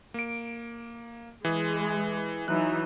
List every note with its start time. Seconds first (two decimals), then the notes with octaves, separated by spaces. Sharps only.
0.14 A#3 D7
1.45 E3 G#3 G#4
2.48 E3 F#3 D#4 F#6